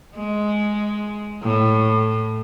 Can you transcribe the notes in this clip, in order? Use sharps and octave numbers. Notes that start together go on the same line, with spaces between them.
G#3
A2